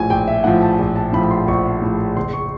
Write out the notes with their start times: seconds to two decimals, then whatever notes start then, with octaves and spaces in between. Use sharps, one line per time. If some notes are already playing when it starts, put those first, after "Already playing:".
Already playing: A#1 A2 F3 G#5
0.10 A#1 G5
0.28 E5
0.44 A2 F3 F#5
0.62 A5
0.79 A#1
0.96 A5
1.13 A2 F3 B5
1.23 B5
1.31 C6
1.48 A#1 C#6
1.82 A2 F3
2.17 F#1 C6
2.33 C#6